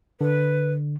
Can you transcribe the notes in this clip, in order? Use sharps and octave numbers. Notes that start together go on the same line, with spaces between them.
D3 B4